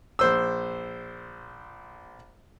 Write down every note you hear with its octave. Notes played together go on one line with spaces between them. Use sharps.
A#1 C5 E6